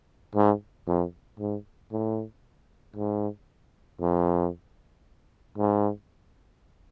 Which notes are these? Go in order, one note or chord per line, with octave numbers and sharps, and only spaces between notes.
G#2
F2
G#2
A2
G#2
F2
G#2